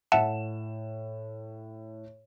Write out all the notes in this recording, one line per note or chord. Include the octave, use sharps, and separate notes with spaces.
A2 E5 F#5 A5 E7